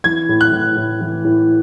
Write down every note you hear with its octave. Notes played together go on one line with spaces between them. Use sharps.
E3 G#6
A2
F#6
A2
A2
E3
A2